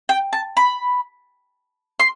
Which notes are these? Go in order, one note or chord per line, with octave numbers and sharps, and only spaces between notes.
G5
A5
B5
C6